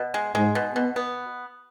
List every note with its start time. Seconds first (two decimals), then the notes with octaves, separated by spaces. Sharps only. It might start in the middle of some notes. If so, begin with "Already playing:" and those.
Already playing: B2
0.14 G#3
0.35 G#2 G#3
0.55 B2
0.75 B2 B3
0.96 B3